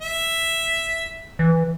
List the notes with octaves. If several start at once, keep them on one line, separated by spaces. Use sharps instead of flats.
E5
E3